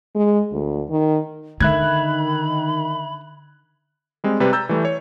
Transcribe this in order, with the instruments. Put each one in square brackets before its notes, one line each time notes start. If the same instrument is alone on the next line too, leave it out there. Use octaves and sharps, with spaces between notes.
[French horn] G#3
D2
D#3
[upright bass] D3 [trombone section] D#3 [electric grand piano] E5 F#6 G#6 [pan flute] B5
[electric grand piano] G3 G#3 C4
C3 G3 B4
A#5 E6 G6 A6
E3 G3 A3
C#5